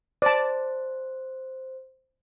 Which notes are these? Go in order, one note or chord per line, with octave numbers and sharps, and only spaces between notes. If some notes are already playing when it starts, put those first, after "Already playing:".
C5 D5 A5